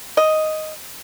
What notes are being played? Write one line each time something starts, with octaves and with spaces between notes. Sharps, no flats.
D#5